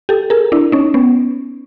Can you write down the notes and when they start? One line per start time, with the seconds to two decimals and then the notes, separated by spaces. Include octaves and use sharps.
0.09 G4 A4
0.30 G#4 A#4
0.52 D4 E4
0.72 C#4 D#4
0.94 B3 C#4